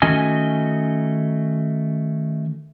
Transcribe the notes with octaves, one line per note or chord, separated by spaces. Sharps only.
D#3 A3 C#4 F#4 D#5 G#5